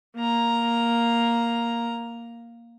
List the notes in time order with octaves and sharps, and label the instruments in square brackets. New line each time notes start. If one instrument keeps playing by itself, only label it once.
[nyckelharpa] A#3 A#5